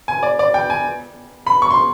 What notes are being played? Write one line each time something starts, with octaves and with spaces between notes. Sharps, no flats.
G#5
D5
D5
G5
G#5
B5
C#6
C6